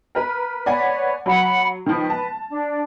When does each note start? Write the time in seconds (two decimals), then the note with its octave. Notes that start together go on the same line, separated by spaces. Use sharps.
0.15 A#4 B4
0.66 B4 C#5 D5 F#5 G#5
1.26 F#3 F#5 B5
1.86 D#3 F3 B4
2.10 A5
2.49 D4